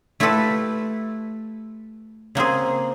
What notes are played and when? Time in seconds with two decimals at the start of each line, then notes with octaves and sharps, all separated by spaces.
0.20 A3 E4 F4 G4 A4 B4
2.35 C#3 A#3 C4 G#4